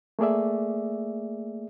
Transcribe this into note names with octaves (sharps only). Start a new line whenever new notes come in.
A3 A#3 G#4 D5 E5